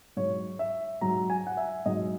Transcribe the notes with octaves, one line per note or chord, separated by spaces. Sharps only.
G#2 F#3 C#5
E5
G#2 F#3 A#5
G#5
F#5
E5
G#2 F#3 D#5